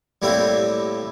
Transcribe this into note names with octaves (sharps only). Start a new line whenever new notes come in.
A2 G3 A#3 C4 E4